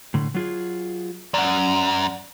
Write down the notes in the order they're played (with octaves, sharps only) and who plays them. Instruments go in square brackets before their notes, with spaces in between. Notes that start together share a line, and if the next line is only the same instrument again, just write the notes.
[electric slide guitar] A2 D3
F#3 F4 G#4
[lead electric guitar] F#2 [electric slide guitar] D5 F#5